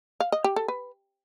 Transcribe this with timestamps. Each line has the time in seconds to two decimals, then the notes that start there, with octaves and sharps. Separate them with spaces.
0.20 F5
0.32 D#5
0.44 G4
0.56 A4
0.68 B4